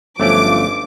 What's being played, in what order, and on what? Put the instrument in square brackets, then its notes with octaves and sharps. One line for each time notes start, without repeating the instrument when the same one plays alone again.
[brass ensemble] G1 F3 [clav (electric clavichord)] F#3 A3 C#4 [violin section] D6